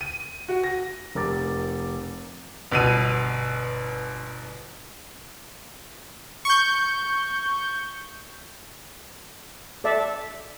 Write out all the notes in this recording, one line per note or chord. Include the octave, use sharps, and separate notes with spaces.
D#7
F#4
A#6
F1 A#4 D6 A6
G1 B2 D#7
C#6 G6
A4 D5 E5